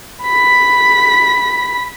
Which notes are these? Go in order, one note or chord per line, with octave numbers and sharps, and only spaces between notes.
B5 B6